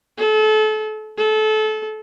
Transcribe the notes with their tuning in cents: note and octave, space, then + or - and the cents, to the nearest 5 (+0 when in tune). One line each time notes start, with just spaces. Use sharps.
A4 -30
A4 -25